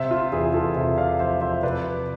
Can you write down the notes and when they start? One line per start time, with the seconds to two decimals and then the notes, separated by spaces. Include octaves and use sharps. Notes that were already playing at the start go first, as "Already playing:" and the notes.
Already playing: C3 C5 E5
0.11 F4
0.32 E2 E4 G#4
0.54 F4 A4
0.76 C3 C5 E5
0.98 D5 F5
1.20 F3 C5 E5
1.41 C5 E5
1.63 C3 B4 D5